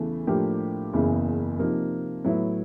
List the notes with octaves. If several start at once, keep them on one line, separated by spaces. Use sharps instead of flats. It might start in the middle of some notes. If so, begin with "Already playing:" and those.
Already playing: E2 C#3 E3 A3
A2 F3 A#3 D4 G4
F#1 E2 C#3 E3
C3 F3 A#3 D#4
A2 F#3 B3 E4